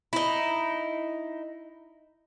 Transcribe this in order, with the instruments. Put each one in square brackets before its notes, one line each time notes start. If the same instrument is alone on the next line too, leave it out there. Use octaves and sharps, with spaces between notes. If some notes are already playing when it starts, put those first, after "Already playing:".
[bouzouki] D#4 E4